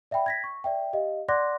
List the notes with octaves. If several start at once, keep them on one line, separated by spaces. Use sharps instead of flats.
D5 E5 F#5 G5 B5
G#6 A#6 B6
C#6
D5 E5 G5
G4 D#5 F5
D5 F#5 C6 D6 F#6 A#6